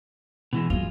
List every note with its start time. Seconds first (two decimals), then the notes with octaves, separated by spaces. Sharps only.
0.53 B2 E3 G#3
0.70 F#2 E3 G#3 F4